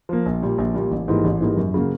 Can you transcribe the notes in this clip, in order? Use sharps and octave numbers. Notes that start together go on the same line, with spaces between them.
F3 A#3
A#1
A#2 G3
A#1
A#2 G3
A1
G#2 E3 G3 A#3
A1
G#2 E3 G3 A#3
F#2
C#3 F#3 A#3